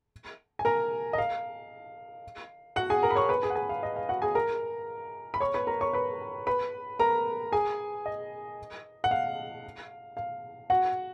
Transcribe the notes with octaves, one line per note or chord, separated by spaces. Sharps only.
G#5
A#4 A#5
D#5
F5
F#4 F#5
G#4 G#5
A#4 A#5
B5
C#5 C#6
B4 B5
G#4 G#5
F#5
G#4 G#5
F5
D#5
F5
F#4 F#5
G#4 G#5
A#4 A#5
B5
C#5 C#6
B4 B5
A#4 A#5
C#5 C#6
B4 B5
B4 B5
A#4 A#5
G#4 G#5
D#5
F#5
F5
F5
F#4 F#5